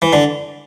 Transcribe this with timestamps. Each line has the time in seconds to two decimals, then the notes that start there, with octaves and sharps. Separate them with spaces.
0.02 E3
0.13 D3